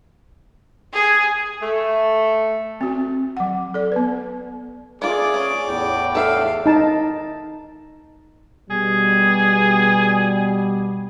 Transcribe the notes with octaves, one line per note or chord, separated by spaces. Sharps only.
G#4 G#5
A3
C4 F#4
F#3 F#5
A4 D5
B3 B4
A3 F4 G#4 D5
C#4
E2 A2 A3 G5
A4 E5 F5
D#4 A5
B2 G3 G#4